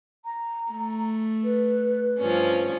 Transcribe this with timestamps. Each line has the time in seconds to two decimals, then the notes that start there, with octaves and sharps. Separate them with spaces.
0.25 A#5
0.71 A3
1.44 B4
2.20 G2 F3 C#4